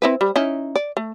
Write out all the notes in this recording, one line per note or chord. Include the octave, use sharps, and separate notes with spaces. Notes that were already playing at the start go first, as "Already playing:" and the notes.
C4 E4 B4
G3
C#4 D#4 E4
D5
A3